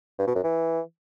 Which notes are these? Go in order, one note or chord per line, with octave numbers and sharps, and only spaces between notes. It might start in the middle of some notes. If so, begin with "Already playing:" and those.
G2
B2
F#2
E3